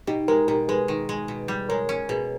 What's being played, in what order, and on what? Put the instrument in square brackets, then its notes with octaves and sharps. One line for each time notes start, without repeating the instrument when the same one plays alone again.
[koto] B2 [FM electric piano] D#4 G4
[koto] G#3 [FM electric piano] G4 A#4
[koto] B2 [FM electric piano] G4 A#4
[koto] G#3 [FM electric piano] G#4 B4
[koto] D#3
G#3
B2
G3
[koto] G#3 [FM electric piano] A#4 C#5
[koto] C#4
[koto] B2 [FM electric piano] G#4 B4